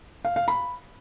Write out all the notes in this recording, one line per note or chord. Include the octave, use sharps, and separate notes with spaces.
F5
F5
B5